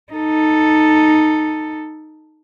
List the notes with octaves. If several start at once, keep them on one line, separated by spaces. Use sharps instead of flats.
D#4 A4